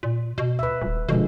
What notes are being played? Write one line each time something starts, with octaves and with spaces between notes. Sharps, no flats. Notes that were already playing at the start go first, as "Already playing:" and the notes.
A#2
B2
B4 E5
D#1
B2 D3 F3 G#3